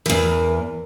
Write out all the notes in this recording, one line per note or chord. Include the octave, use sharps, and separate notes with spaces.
E2 E3 A#4